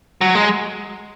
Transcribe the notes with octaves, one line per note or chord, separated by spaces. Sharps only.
F#3
G#3